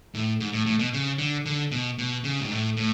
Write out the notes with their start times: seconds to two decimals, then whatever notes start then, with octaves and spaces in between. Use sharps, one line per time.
0.15 A2
0.40 G#2
0.53 A2
0.66 A2
0.79 B2
0.93 C#3
1.18 D3
1.46 D3
1.71 B2
1.99 B2
2.24 C#3
2.40 G#2
2.51 A2
2.77 A2